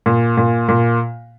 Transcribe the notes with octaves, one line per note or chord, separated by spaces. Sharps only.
A#2
A#2
A#2